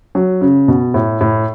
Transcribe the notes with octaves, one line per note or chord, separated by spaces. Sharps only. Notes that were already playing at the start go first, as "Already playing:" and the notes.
F#3
C#3
B2
A2
A2